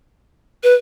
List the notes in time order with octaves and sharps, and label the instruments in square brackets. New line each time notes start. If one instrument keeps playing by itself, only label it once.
[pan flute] B4